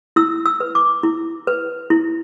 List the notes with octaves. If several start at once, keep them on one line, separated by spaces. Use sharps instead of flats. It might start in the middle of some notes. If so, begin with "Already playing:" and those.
E4 E6
E6
B4
D6
E4
B4
E4